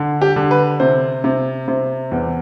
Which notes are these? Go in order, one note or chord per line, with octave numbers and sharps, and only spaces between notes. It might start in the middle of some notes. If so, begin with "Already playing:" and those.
Already playing: D3
G4
D3
B4
C3 C5
C3
C3
E2